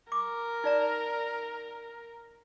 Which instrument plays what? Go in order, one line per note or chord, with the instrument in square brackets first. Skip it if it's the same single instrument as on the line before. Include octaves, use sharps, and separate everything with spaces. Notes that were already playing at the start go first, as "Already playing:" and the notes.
[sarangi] A#4 [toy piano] D6
[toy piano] D#4 D5 A#5